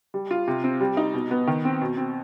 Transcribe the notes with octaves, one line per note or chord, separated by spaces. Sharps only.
G3
F4
C3
C4
G3
D#4
B2
B3
D#3
C4
B2
C4